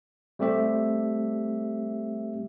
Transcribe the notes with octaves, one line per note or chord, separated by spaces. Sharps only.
G3 A3 C4 G4 E5